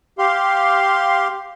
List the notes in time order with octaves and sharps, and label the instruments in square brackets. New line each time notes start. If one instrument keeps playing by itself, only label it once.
[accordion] G4 F5 C6